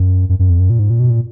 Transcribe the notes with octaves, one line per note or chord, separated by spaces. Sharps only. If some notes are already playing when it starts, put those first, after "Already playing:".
Already playing: F#2
F#2
F#2
F2
F#2
A#2
G#2
A#2
B2
A#2